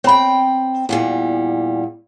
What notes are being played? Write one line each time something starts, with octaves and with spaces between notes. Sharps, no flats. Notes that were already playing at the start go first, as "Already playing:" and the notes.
C4 C#5 G5 B5
E2 A#2 G3